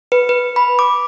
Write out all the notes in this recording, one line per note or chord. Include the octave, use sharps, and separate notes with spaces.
B4
B4
B5
D6